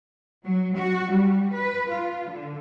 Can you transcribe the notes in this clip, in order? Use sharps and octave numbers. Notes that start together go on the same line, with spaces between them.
F#3
F#4
G3
B4
F4
D3